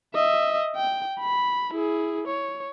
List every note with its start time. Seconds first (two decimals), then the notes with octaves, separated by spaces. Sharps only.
0.14 D#5 E5
0.76 G5
1.20 B5
1.74 E4 G#4
2.27 C#5